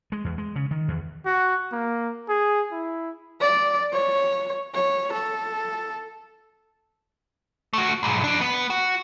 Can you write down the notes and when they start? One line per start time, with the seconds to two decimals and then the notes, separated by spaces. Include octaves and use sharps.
0.12 G#3
0.25 E2
0.38 G#3
0.56 C#3
0.71 D#3
0.88 E2
1.26 F#4
1.72 A#3
2.29 G#4
2.71 E4
3.41 D5
3.93 C#5
4.75 C#5
5.13 A4
7.73 A3 F#4
8.03 B1 G#2
8.24 F2 D4
8.41 B3
8.70 F#4